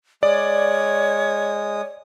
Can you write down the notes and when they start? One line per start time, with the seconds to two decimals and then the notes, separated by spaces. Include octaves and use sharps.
0.23 G#3 C#5 D5 D#6